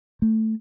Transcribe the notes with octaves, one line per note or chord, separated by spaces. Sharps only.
A3